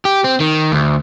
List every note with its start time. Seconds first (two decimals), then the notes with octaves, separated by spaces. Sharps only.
0.05 G4
0.24 C4
0.40 D#3
0.72 D2